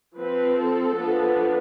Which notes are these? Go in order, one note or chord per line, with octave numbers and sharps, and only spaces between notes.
F3 C4 B4
A4
F3 B3 D4